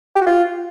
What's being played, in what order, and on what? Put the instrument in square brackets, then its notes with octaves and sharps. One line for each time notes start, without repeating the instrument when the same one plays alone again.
[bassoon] G4
F#4
F4